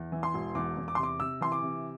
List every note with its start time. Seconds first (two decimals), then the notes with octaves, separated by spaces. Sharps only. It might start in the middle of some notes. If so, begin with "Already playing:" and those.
Already playing: E2
0.12 E3
0.23 C6
0.34 E1
0.55 E2 D6
0.77 E2
0.88 D6
0.95 C6
0.98 C3 D6
1.20 C3 E6
1.41 E3 C6
1.52 D6
1.62 C3